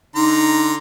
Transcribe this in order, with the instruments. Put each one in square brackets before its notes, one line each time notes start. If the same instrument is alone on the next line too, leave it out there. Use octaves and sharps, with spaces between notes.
[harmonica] D3 A#5 C6 [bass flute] D#4